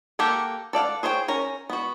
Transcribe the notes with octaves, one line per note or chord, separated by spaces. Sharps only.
A#3 G4 A4 A#4 F#5
A4 D5 F5 F#5
G#4 C5 C#5 F5 G5
C#4 A#4
B3 F#4